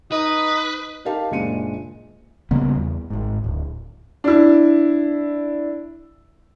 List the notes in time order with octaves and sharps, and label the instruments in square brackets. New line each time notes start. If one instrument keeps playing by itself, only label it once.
[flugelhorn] D#4 [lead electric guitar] B4 [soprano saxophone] D#5
[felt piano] D#4 G4 A#4 F5 A5
F#1 A#2 G#3 D4 C#7 D#7
[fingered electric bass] C#3 G3 A#3 B3
E2
G#1 G#2
D1
[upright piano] D4 E4